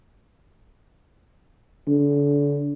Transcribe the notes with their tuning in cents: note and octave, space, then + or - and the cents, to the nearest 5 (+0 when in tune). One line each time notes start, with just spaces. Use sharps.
D3 -35